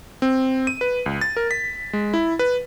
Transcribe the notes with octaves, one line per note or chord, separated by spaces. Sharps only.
C4
D#7
B4
C#2
A6
A#4
B6
G#3
E4
B4